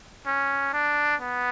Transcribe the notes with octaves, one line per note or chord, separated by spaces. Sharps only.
C#4
D4
B3